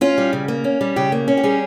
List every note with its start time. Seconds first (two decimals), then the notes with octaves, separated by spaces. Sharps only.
0.01 C#4 F4
0.18 G3
0.33 C#3
0.48 A#3
0.64 C#4
0.81 G3
0.96 C#3 G4
1.12 A#3
1.28 C#4
1.37 G4
1.43 G3 G#4